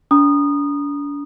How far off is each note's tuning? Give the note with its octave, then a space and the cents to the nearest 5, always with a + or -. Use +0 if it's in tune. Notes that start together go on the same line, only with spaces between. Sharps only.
D4 -40 A#5 +25 D#6 -20